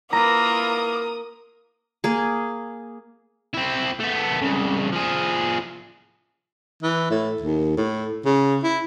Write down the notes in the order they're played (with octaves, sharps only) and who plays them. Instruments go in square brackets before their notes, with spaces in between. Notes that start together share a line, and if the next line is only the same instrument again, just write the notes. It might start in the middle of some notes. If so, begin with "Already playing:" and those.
[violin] A#3 [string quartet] E4 F4 B4 [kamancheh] A#4 D#6 [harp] A#5 A#6
[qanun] A#3 G#4
[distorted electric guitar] C4 E4
A3 B3
C2 C#3
F3 G#4
[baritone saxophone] E3
A2
D#2
A2
C#3
E4